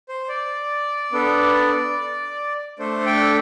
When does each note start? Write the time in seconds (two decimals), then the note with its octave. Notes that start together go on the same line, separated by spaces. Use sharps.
0.09 C5
0.29 D5
1.12 B3 D4 A4
2.79 A3 D4 A4 C5
3.06 G5